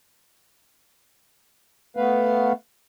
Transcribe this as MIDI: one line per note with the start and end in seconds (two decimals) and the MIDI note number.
1.97 2.52 57
1.97 2.52 59
1.97 2.52 71
1.97 2.52 77